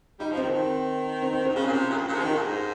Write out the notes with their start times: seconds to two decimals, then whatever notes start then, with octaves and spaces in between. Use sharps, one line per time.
0.20 G3 D#4
0.31 F3
0.37 C4
0.42 D#3
0.50 C#3
0.53 D#3
1.22 C4
1.33 C4
1.45 C3 C4
1.56 C#3 C#4
1.65 A#2
1.73 C3
1.90 A#2
1.96 F2
2.01 G2
2.08 A#2
2.13 C3
2.19 F3
2.23 D#3 D#4
2.35 A#2
2.41 G2
2.46 G#2